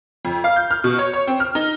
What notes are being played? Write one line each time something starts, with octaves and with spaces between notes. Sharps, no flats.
F2
F5
G6
F6
B2
C#5
C#5
C4
F6
D#4